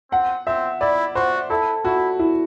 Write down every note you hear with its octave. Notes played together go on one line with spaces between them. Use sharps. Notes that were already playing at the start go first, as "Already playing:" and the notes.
C4 F#5
C4 E5
E4 D5
F#4 C5
E4 A4
E4 F#4
E4